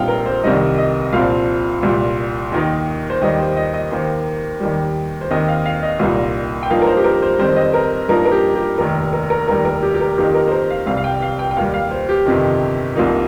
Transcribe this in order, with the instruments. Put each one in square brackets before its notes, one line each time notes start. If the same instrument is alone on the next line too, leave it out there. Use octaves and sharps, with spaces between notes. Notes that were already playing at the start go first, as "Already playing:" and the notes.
Already playing: [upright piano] A#1 A#2 G3 C4 D#4 F5 G5
A#4
C5
C2 C3 D#3 G3 D#4 D#5
D#5
C2 A#2 F3 C4 F5
C2 A#2 G3
D#2 D#3 A#3 D#4
C5
D#2 D#3 G3 A#3 D#5
C5
D#5
D#5
D#2 D#3 A#3 C5
D#2 D#3 G3
C5
D#2 D#3 C4 D#5
F5
F5
D#5
C2 A#2 G3 A#3 D#4
G5
G2 F3 A#3 D#4 F5
A#4
C5
G4
A#4
C5
F2 D#3 G3 C4 C5
D#5
A#4
G2 F3 A#3 D#4 A#4
A#4
G4
G4
F1 D#2 D#3 A#4
A#4
A#4
F1 D#2 D#3 G3 A#4
A#4
G4
G4
A#4
F2 D#3 A#3 D#4 G4
A#4
C5
A#4
F5
C2 C3 G3 F5
F5
G5
F5
G5
G5
D#2 D#3 G3 F5
F5
C5
G4
G1 F2 C3 D#3
C2 C3 F3 A#3 D#4